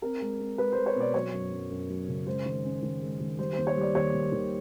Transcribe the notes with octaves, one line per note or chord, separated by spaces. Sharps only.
C4 A#4
G#3
C4
G#3 B4
G#3 C5
C#5
B2 D5
F#3 C#5
F#2
F#2
F#2
F#3
C#3
G#3 C5
D#3
C#4
D#3
G#3
D#3
G3 C5
D#2 C5
C#5
G3 D5
D#2 C#5
D#3
D#3